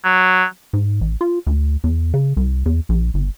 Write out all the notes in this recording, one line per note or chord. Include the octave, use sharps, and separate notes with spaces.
F#3
G#2
A1
F4
D2
E2
C#3
C2
E2
A#1
G1